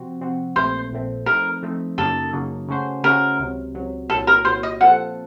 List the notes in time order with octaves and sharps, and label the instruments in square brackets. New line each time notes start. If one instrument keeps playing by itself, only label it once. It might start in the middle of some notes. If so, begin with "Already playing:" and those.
Already playing: [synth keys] C3 F3 C4 F#4
C3 F3 C4 F#4
[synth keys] A#1 A#2 A3 C4 [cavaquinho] C5
[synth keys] A#1 A#2 A3 C4
[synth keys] F3 A3 C4 D#4 [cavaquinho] A#4
[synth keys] F3 A3 C4 D#4
[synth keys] F#2 C#3 F#3 A#3 D#4 [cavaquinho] A4
[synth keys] F#2 C#3 F#3 A#3 D#4
C#3 A3 C#4 F#4 C5
[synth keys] C#3 A3 C#4 F#4 C5 [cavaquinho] A#4
[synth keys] C#2 C3 F#3
C#2 C3 F#3
[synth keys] C2 A#2 F#3 [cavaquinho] A4
[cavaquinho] A#4
[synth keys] C2 A#2 F#3 [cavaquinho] C5
[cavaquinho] D#5
[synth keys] A#2 F3 C4 F4 A4 [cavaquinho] F#5